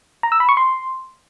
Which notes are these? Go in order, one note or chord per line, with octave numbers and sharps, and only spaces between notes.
A#5
E6
B5
C#6
C6